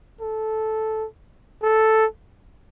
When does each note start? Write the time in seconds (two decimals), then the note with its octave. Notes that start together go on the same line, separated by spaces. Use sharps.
0.21 A4
1.63 A4